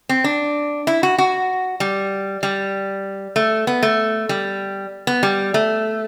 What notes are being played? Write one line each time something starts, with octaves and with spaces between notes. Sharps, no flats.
C4
D4
E4
F#4
F#4
G3
G3
A3
B3
A3
G3
B3
G3
A3